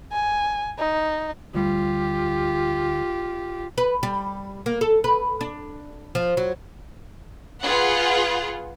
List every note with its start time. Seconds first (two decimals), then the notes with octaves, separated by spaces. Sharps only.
0.13 G#5
0.79 D#4
1.54 D2 G3 F4 G4
3.78 B4
4.03 G3
4.66 A#3
4.81 A4
5.04 B4
5.41 D4
6.15 F3
6.37 F#3
7.64 F4 G#4 B4 F#5